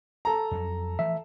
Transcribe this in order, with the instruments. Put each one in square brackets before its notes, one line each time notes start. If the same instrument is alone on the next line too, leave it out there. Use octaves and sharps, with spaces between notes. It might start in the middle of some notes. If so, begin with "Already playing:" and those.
[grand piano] A4 A#5
[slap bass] F2 F#3
[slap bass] E3 F3 A3 [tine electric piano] E5